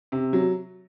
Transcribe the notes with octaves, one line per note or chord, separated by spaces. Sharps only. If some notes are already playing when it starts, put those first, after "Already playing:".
C3
F#3